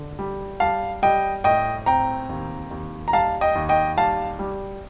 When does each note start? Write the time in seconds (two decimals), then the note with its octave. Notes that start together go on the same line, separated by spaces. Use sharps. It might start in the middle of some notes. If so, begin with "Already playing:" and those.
Already playing: D3
0.19 G3
0.60 G3 F5 A5
1.02 G3 D#5 G5
1.44 A2 D#5 G5
1.86 C4 G5 A#5
2.29 D#2
2.71 D#2
3.08 A#5
3.13 G3 F5 A5
3.41 D#5 G5
3.55 D#2
3.69 D#5 G5
3.97 G3 F5 A5
4.39 G3